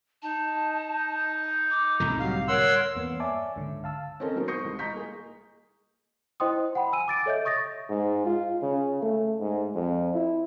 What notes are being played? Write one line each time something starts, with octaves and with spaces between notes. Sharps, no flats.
D#4 A5
D6
C2 A2 D3 A#5
F#3 G4 F5
A#4 C#5 F#5 C6 E6
E2 G2 A#3 B3
C#5 D5 E5 G#5 A5 D6
C#2 G#2 D3
F5 A5 E6
C4 C#4 A4 A#4 D#5
F#3 B3 D#4 A#4 C5
C#6 D#6 G6 A#6 C7 C#7
C2 G#2
D#5 A#5 C#6 G6 B6
A#3 G#4
E4 C5 D#5 G5 C6 D#6
F#5 G5 B5
G#5 E6 D#7
D6 A6 D7
A4 C#5 D#5 E5 G6
C#6 D#6 A6 A#6
G#2
F4
C#3
A3
G#2
F2
E4